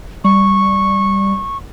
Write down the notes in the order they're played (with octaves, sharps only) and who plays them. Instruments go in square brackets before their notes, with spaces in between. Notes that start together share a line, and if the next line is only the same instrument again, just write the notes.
[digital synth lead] G3 [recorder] C#6